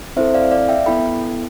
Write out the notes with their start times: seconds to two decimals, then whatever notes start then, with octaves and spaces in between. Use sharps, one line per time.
0.16 C4 E4 A4 C5 E5
0.34 D5 F5
0.51 D5 F5
0.69 E5 G5
0.86 B3 E4 A4 G5 B5